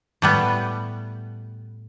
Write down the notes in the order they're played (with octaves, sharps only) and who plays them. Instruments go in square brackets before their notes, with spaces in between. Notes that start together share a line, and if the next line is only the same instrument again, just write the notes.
[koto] A2 G3 B3